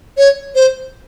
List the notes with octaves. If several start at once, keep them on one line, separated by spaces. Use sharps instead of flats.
C#5
C5